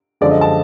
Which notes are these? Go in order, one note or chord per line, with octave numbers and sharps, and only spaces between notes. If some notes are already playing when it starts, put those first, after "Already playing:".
F#2 D3 F3 G#3 D5
D#5
A5